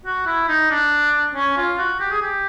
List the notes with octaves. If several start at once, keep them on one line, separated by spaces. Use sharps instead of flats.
F#4
E4
D#4
D4
C#4
F4
F#4
G4
G#4
G4